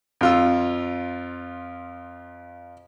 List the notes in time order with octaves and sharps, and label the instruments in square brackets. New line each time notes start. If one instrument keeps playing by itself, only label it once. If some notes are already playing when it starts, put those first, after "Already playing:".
[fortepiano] F2 F4 E6